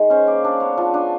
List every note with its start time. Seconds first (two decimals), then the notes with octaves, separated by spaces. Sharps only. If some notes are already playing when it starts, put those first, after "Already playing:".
Already playing: D#3 G#3 G#4
0.10 C#4 C5
0.27 A#3 D5
0.44 D4 D5
0.60 B3 C#5
0.78 F3
0.94 D4